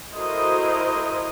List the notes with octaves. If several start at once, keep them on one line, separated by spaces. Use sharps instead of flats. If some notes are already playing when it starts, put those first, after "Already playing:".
E4 F#4 A4 A#4 C5 D#5